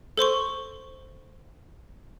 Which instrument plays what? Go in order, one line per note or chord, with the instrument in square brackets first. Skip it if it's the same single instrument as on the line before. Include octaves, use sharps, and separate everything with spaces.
[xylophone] A4 C5 C6 C#6